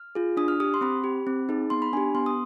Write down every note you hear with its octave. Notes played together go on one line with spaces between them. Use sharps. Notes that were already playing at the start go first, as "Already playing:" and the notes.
Already playing: F6
F4 G#4
D4 D#6
F6
G4 D#6
C6
C4 B5
G4
C4
D#4 G#4
B3 C6
B5
D4 G4 G#5
B3 C6
D#6